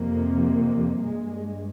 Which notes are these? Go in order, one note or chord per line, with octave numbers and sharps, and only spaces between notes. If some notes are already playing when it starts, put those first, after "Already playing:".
Already playing: F2 C3 A#3
G2 G#3